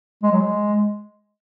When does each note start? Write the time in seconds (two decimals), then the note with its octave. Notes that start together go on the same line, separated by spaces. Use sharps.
0.23 G#3
0.32 F#3
0.41 G#3